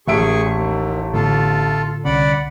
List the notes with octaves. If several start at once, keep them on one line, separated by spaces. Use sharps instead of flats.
A1 A#2 A3 G#4 E5 C#6 D7
D#2
A2 D3 B3 F4 A4
C2 D3 C#4 D5 F#5 B5